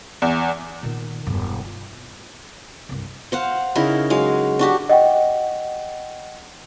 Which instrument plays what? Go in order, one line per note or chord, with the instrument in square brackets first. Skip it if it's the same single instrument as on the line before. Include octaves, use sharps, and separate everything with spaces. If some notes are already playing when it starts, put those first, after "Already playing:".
[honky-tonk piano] E2
[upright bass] A#2 D#3
E1 G2
F4
C2 G2
[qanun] C5 F5 F#5
C#3 D#4 E4 A#4
F#3 G#3 F5
D4 F#4 G4
[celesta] D#5 F#5 G5